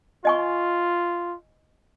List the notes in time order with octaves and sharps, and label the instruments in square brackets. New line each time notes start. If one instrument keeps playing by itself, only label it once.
[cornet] F4 [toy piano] D#5 G#5 C#6